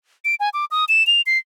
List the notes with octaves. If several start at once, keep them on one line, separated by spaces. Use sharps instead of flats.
D7
G#5
D6
D#6
E7
F7
C7